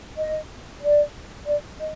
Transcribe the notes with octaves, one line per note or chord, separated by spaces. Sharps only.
D#5
D5
D5
D#5